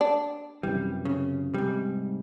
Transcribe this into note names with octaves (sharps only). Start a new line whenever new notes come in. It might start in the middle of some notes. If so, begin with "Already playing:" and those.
D4
F#2 C3 E3 G3
C#3
G#2 C3 G3